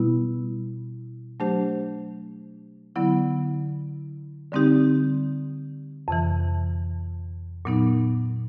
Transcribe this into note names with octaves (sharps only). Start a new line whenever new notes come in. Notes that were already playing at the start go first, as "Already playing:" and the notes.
Already playing: B2 G3 B3 E4
F#3 A3 D4 G4 C5
D3 F#3 B3 E4
D3 G3 C4 D#4 G4
F2 C3 E3
A#2 F#3 B3 D#4